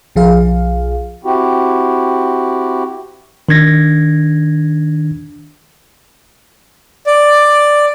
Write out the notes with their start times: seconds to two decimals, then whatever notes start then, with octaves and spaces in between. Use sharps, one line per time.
0.16 B1 F3 G#4 F5
1.24 C4 E4 F#4 G4
3.49 D#3 D4 G#6 A#6
7.06 D5